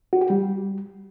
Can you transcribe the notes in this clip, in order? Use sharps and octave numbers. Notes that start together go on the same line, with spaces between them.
F#4
G4
G3